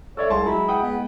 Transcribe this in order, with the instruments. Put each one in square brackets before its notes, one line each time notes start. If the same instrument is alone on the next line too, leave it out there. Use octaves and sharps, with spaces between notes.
[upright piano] A4 D5 E5 [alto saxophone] C#5
[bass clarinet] C2 [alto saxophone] G#3 [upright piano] G#5 A5 C6
[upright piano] F#3 [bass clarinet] E4
[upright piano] F#5 G5 D#6
[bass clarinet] B3